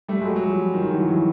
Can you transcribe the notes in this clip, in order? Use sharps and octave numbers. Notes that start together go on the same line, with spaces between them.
G3 A3
F#3 G#3
F#3
F3 G3
D#3 F3
E3 F#3
E3 F#3